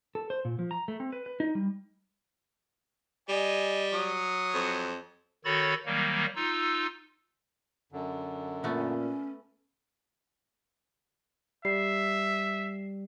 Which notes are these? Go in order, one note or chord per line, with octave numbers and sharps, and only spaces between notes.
A4
C5
A#2
F3
A#5
A3
C4
B4
B4
D#4
G3
G3 D#5 G#5
F#3 C#5 D#6
F2
D#3 F#4 A4 C#5 B5 A6
D#3 F#3 G3 A#3
D#4 F4 E6
F#2 D3
A#2 A3 B3 C#4
G3 E5 C7